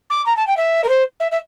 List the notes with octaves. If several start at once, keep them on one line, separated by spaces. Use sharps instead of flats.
D6
A#5
A5
G5
E5
A#4
C5
E5
E5